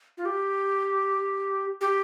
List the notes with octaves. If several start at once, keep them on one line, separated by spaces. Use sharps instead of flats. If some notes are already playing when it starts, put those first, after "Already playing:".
F4
G4
G4